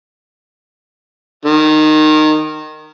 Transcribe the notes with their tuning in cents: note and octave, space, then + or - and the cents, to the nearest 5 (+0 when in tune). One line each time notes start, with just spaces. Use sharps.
D#3 -15